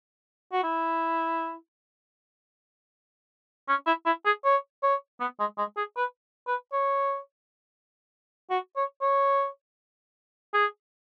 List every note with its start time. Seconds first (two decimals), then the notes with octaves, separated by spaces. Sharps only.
0.52 F#4
0.63 E4
3.69 C#4
3.87 E4
4.06 E4
4.25 G#4
4.45 C#5
4.83 C#5
5.20 B3
5.40 G#3
5.58 G#3
5.77 G#4
5.97 B4
6.47 B4
6.73 C#5
8.50 F#4
8.76 C#5
9.02 C#5
10.54 G#4